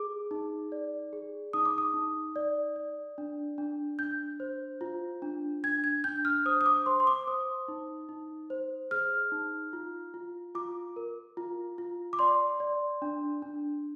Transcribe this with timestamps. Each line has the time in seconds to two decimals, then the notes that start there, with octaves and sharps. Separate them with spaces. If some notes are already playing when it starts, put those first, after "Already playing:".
Already playing: G#4 D6
0.31 D#4
0.72 D5
1.13 G#4
1.53 D#4 D#6
1.65 D6
1.78 D#6
1.94 D#4
2.36 D5
2.76 D5
3.18 D4
3.58 D4
3.99 D4 G6
4.40 C5
4.81 F4
5.22 D4
5.64 D4 G#6
5.84 G#6
6.04 D4 G6
6.25 F6
6.46 C5 D#6
6.61 D#6
6.66 D6
6.86 C5 C6
7.00 C6
7.07 D6
7.27 C5 D#6
7.68 D#4
8.09 D#4
8.50 C5
8.91 G#4 F6
9.32 D#4
9.73 F4
10.14 F4
10.55 F4 D6
10.96 A#4
11.37 F4
11.78 F4
12.13 D6
12.19 D5 C6
12.60 D5
13.02 D4
13.42 D4